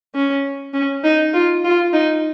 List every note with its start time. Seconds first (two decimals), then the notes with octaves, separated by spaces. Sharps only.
0.15 C#4
0.74 C#4
1.04 D#4
1.34 F4
1.64 F4
1.93 D#4